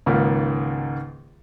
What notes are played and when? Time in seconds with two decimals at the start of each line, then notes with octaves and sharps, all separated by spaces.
0.06 C#2 G#2 D#3 A#3